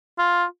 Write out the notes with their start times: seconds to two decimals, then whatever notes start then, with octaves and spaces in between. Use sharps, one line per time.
0.19 F4